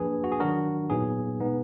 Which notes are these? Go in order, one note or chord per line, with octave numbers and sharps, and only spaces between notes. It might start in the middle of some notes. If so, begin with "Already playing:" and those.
Already playing: F3 A#3 D4 G#4 B4
F#4
G#4
D#3 F#3 D4 F#4 A#4
A#2 F#3 B3 D#4 G#4
B2 G#3 B3 D#4